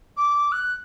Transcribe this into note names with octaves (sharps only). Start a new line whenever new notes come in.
D6
F#6